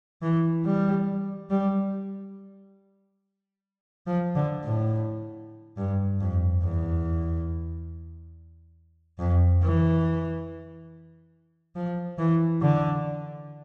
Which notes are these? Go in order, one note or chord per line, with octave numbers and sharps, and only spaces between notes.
E3
G3
G3
F3
D3
A2
G2
F2
E2
F2
E3
F3
E3
D3